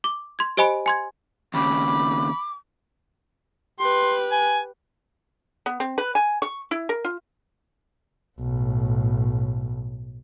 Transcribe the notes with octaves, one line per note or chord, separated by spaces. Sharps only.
D6
C6 G#6
G4 C5 D#5 G#5 B5 D7
G#5 C6 G#6
D#2 C#3 B5 D6
G4 B4 C6
G#5
B3
C4
B4
G#5
C#6
E4
A#4
F4
B1 A2